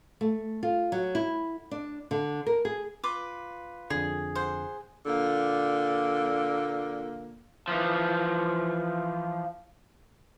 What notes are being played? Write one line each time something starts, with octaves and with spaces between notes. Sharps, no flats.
A3
F4
F#3
E4
D4
D3
A#4
G#4
F4 B4 D6
F2 D3 G#4
C5 F#5
A#2 D3 A#3
E3 F3